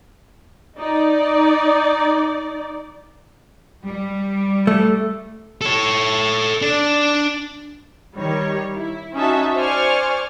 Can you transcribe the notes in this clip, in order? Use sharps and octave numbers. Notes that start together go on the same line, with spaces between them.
D#4 D5
G3
A3
A4 C#5
D4
D#3 G3 C#5
E4
C#4 D#4 F#4 E5 A5
C5 D5 G#5 C#6 F6 G#6